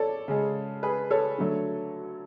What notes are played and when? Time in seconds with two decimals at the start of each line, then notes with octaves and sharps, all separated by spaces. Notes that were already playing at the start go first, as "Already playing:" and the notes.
Already playing: A4 C#5 D5
0.28 C#3 G#3
0.83 G#4 B4
1.11 A4 C#5
1.38 D3 F#3 A3